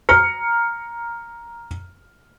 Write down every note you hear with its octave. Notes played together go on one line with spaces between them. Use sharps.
A#5 F6 C#7